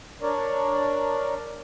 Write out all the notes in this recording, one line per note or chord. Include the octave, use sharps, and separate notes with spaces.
D4 A#4 C#5 D5